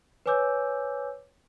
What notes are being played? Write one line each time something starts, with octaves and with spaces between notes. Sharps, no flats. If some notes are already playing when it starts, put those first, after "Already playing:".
B4 C#5 G#5 D6 E6 G6